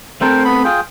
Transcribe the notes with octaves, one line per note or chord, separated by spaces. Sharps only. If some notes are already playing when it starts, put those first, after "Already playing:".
A3 C4 A4 A#4 C5 G5
B3 B5
F4 G#4 G5